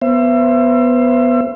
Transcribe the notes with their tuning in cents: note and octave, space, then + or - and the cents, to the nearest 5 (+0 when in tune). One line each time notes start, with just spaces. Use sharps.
B3 +0 C5 +15 E5 +35